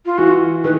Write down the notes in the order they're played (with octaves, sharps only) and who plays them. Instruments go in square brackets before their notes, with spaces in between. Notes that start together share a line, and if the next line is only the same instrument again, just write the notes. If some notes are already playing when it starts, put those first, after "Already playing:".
[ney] F4
[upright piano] E3 [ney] F#4
[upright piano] D#3 [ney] B4